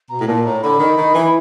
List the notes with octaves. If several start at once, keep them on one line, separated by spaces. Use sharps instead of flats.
B2 A#5
A2
A#2 A5
A2 A#5
D3 B5
D#3
D#3
E3